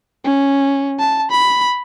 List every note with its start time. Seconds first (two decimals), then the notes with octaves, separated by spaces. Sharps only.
0.24 C#4
0.99 A5
1.31 B5